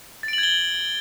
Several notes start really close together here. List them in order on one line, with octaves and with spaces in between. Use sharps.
A6 D7 F#7 G#6 G7